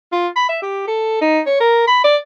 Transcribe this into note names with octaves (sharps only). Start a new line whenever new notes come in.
F4
B5
E5
G4
A4
D#4
C#5
A#4
B5
D5